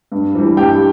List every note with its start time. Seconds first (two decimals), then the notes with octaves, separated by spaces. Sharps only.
0.12 G2
0.35 E3 G3
0.57 G2 G4 G5